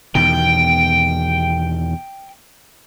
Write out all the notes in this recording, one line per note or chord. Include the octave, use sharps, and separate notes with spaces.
E2 B2 D#3 G5